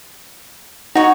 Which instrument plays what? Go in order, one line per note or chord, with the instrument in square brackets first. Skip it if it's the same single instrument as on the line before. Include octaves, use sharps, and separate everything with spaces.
[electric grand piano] D#4 [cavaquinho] F#4 C#5